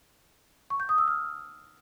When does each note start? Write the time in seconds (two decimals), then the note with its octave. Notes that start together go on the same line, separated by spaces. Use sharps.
0.70 C#6
0.80 G6
0.89 D#6
0.98 E6
1.08 F6